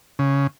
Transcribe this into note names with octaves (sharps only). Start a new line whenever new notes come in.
C#3